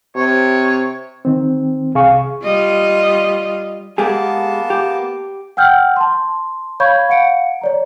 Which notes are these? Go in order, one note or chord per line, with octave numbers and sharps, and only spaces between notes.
C3 C#5
D#3 C4
C2 C3 G#4 F5 C#6
G3 F4 D#5
G#3 A#3 B3 G4 G#4 A5
G4
F#5 G5 E6 F6 G6
A5 C6
C#5 F5 B5 C#6 G6 G#6
F5 F#5 C#7 D7
C#5 D5 A#5